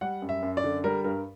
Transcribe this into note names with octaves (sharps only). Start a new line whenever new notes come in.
G3 F#5
F#2
E5
F#2
D5
D3
G3 A#4
G2 A#4